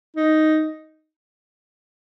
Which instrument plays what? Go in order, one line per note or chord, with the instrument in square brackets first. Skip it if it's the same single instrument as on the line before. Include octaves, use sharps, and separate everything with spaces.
[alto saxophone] D#4